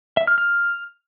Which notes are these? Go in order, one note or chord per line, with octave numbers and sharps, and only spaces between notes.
E5
F6
F6